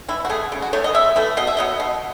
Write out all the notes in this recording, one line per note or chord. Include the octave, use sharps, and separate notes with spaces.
E3 E4
F#4
A3 G#4
C#3
F#4
E3 A3 C#5
D#5
C#3 E5
E3 A3
B2 D#5
E5
F#3 B3 D#5
B2